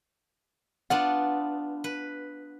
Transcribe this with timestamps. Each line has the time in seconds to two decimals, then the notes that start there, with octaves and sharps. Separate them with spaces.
0.90 B3 D4 F4 F#5
1.84 B4